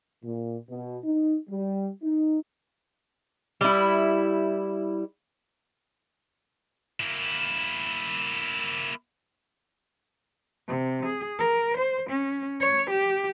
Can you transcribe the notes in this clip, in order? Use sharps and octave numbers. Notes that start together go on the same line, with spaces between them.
A#2
B2
D#4
G3
D#4
G3 E4
A#3 E4
C3
G#4
A#4
C5
C#4
C#5
G4